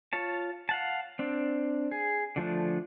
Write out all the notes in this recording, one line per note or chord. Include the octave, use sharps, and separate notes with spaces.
F4 C#5 A5
F5 F#5 A5
C4 D4
G#4
D3 F3 A3 D4